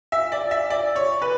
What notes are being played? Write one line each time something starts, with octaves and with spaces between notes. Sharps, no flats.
E5
D5
E5
D5
C#5
B4